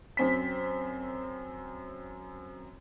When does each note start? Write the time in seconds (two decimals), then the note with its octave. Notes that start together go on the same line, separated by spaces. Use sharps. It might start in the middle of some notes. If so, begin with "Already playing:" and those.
0.17 F#2 C4 B6